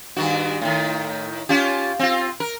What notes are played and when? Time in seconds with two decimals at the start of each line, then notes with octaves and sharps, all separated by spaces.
0.16 G2 D#3 F#4
0.61 A2 D#3
1.49 C#4 F4 G4
1.99 C4 F4
2.40 A#4